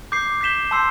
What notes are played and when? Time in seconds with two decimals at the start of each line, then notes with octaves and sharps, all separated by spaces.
0.12 D6 G6 C7
0.41 G6 B6 E7 G7
0.71 A5 C6 E6 G6 C7